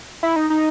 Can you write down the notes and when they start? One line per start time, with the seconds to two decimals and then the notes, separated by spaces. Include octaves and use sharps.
0.23 E4
0.36 D#4
0.50 D#4